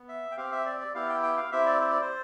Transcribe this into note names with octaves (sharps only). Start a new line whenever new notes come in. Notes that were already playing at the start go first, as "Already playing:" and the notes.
Already playing: B3
E5
G5
C4 G4 F5
E5
D5
D5
B3 E4 G4 F5
G5
G5
F5
C4 E4 G4 E5
D5
C5
D5
C5